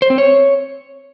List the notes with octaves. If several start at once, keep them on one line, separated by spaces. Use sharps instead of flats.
C5
C4
C#5